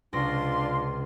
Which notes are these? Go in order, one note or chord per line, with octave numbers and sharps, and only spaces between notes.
C#2 C3 D4 F4 C6 A#6